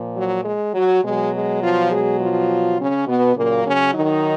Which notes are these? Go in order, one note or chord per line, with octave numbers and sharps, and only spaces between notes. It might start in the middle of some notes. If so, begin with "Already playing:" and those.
Already playing: A#2 F3
F#3
G#3
F#3
B2 F#3 G#3
G#3
F3 F4
G#3 G#4
F3 F4
C#3 C#4
B2 B3
A#2 C#3 F#3 A#3
C#3 C#4
D#3 D#4